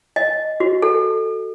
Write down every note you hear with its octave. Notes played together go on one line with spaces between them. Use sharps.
D#5
F#4
A4